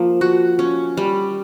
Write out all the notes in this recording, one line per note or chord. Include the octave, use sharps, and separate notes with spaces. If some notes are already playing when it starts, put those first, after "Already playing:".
Already playing: F3 A#3
F#4
C#4
G3